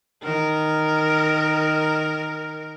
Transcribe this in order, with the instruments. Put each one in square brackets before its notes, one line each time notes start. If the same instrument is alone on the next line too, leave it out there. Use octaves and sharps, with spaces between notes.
[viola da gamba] D#3 [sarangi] A#4